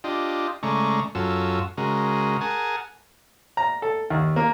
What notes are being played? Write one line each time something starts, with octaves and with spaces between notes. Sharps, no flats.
D4 F4 G4 D#5
C#3 G#3 A3 D5 A#5 C#6
F#2 C#4 F4 F#4 A4 E6
C#3 G#3 F#4 A#4
G#4 A#4 F#5 G#5 A5
A#5
A4
D#2
A#3